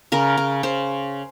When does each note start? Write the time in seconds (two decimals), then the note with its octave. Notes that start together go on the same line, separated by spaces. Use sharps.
0.12 C#3 A#4
0.38 C#3
0.63 C#3 C5